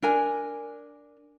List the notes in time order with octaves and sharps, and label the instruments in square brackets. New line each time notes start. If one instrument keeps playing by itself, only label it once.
[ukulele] D4 A#4 G#5